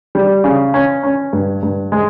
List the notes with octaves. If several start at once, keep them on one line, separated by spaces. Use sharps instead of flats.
G3
C#3
C#4
C#4
G2
G2
G#3